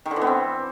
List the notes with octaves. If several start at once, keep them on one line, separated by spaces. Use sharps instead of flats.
D#3
D3
E3
B3
C4